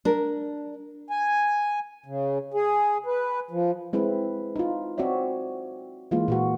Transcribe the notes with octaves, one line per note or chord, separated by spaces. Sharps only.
D4 A#4
G#5
C#3
G#4
B4
F3
G#3 C4 E4 B4
D#4 F4
C4 F#4 C#5 D5 E5
E3 G#3 A#3 F4
A#2 A#3 F#4